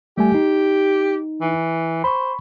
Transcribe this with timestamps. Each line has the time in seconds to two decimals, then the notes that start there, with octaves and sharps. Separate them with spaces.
0.18 G3 A3 G4 G#5
0.35 D#4
1.41 E3
2.04 C5 B5 C#6